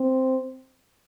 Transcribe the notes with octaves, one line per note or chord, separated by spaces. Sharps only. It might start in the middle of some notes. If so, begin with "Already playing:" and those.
Already playing: C4